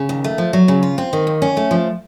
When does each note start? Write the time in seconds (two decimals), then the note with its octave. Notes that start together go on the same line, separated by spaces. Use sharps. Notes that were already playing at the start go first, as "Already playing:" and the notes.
Already playing: C#3
0.09 D#2
0.24 A3
0.38 F3
0.53 F#3
0.68 C#3
0.83 F4
0.98 C4
1.13 D#3
1.27 D#2
1.42 C#4
1.57 A3
1.71 F3